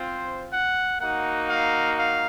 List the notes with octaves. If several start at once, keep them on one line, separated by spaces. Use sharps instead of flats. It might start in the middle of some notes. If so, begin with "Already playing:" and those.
Already playing: C4 F4 C5
F#5
A#3 D#4 F#4 F#5
F5
F5